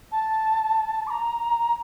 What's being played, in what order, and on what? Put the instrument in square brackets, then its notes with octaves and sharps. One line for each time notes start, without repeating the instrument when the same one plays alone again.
[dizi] A5
D6
A#5